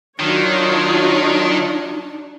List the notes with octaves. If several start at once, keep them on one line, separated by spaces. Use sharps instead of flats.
D#3 F#3 D4 D#4 F4 C#5